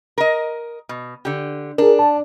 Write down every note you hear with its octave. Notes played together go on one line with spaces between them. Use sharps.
A#4 D#5
B2
D3 G4
D4 G#4 A#4
A5